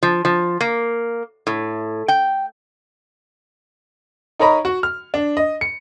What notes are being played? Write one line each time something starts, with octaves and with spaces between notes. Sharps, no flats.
F3
F3
A#3
A2
G5
D#4 A#4 C#5 D#5 A#5 B5
F#4
F6
D4
D#5
C#7